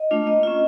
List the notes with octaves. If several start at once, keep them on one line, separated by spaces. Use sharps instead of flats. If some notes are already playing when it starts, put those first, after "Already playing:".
Already playing: D#5
A3 D4 F4
A#3 D#5
C#4 F4